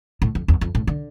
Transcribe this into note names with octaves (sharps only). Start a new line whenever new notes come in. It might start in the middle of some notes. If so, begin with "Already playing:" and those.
A2
F2
E2
F2
A2
D3